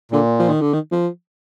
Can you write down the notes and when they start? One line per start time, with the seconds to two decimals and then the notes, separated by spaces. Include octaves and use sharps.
0.11 A#2 D3
0.39 F3
0.50 D#3
0.61 D3
0.73 D#3
0.92 F3